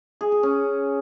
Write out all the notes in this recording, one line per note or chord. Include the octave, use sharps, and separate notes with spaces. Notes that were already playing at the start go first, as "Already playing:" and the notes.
G#4
G#4
C#4